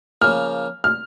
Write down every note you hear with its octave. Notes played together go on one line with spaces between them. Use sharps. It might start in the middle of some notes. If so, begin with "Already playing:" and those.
C#3 F3 A#3 F6
F6